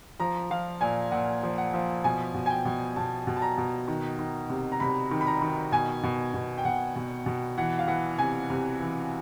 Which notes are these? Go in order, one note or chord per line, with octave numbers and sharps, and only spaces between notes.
F3 A#5
F3 F5
A#2 G#5
A#2 F#5
F3
F#5
F3
B2 G#5
B2
G#5
G5
B2
B2 A5
B2
A5
A#5
B2
D#3
D#3
C3
A#5
C3 B5
D#3
B5
A#5
D#3
B2 G#5
B2
B2
G5
B2 F#5
B2
B2
E3 F#5
F5
E3 F#5
C3 G#5
C3
E3